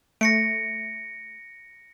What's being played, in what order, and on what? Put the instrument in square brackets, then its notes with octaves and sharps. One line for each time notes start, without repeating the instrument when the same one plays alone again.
[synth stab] A3 [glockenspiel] A#6 C#7 D7